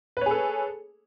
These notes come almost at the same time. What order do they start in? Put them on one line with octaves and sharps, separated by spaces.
B4 C#5 G#4 A4